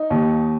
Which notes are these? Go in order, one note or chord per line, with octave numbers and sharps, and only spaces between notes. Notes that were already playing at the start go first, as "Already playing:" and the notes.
Already playing: D#4
D#2